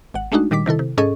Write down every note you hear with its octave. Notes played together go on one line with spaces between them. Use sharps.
G#1 F#5
G#3 A3 D4 D#4 F#4
A#2 D#3 G3 D6 B6
C3 D#3 E4 A4
C3
G#2 C#4 G#4 A4 D#5 C#6